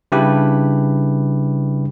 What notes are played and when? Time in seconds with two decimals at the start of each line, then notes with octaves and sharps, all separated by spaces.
0.12 C#3 G3 D4 E4 G4 B4